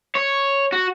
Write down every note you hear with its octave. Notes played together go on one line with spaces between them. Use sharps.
C#5
F#4